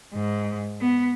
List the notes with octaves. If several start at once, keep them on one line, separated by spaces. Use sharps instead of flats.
G#2
B3